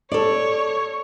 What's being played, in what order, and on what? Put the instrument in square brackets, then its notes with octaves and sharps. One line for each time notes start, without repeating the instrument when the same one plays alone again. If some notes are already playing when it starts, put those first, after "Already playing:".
[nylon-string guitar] A4 D5 [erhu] C#5